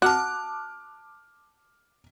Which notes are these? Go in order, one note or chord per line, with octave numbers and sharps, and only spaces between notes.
F#4 A5 D6 F6 F#6